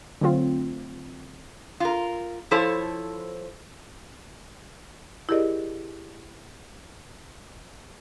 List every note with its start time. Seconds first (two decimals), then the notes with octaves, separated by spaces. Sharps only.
0.21 D3 F#3 A3 C4 F4
1.80 F4 A#4
2.51 F3 E4 A4 C5 C#5 A5
5.29 E4 G4 G#4 A#4 D5 D#5